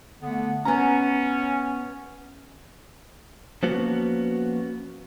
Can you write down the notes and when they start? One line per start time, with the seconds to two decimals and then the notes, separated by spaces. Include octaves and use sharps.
0.22 D3 A3 B3
0.65 B3 C#4 A#5
3.63 F3 A#3 B3 C#4 F#4